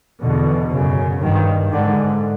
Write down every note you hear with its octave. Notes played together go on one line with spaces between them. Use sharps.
E2 B2 D3
F#2 C#3
G2 D#3
G#2 D3